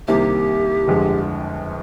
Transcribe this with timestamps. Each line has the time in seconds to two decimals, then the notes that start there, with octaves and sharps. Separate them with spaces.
0.08 C2 C3 D#3 A#3 G4
0.88 G1 F2 D3 G#3